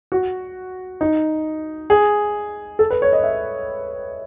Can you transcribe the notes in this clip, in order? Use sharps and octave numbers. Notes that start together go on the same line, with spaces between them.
F#4
D#4
G#4
A4
B4
C#5
D#5
E5